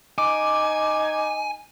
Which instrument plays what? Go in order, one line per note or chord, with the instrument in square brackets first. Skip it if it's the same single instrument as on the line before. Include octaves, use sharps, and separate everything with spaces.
[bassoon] D#4 [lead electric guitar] G#5 [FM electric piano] D6